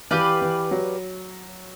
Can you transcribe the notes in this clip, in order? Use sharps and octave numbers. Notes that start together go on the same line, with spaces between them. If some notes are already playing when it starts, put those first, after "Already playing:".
E3 G4 B4 D5 F5
E3
F#3